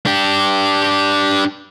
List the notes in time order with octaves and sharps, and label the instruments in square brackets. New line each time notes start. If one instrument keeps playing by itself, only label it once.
[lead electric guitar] D4 G4